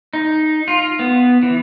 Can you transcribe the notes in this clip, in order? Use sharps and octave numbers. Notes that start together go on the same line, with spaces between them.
D#4
F4
B3
E3